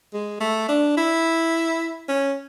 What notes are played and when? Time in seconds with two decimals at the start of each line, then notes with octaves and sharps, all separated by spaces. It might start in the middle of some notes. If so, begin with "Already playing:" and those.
0.13 G#3
0.41 A3
0.69 D4
0.97 E4
2.09 C#4